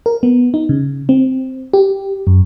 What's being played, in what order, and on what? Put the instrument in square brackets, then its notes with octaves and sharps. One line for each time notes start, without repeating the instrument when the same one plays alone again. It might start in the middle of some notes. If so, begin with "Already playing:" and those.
[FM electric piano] A#4
B3
D#4
C#3
C4
G4
F#2